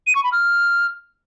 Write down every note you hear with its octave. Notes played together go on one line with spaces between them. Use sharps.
D#7
C#6
B5
F6